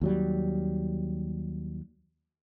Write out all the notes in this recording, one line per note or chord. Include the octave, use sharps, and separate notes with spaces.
D#2 F#3 G3